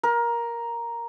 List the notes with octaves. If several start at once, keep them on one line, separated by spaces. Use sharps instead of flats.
A#4